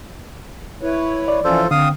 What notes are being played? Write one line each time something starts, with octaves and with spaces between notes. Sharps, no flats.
E4 B4 C#5
D5
E3 F3 C#4 F4 A4 C5
D3 C4 F5 D#6